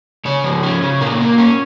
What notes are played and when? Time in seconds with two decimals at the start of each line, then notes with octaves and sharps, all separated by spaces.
0.25 C#3 C#5
0.44 F3
0.63 C#4
0.82 C#3
1.01 A#2 A#4
1.20 A#3
1.38 C#4